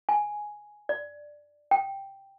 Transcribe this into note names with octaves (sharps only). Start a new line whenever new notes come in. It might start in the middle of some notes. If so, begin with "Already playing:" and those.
G#5
D5
G5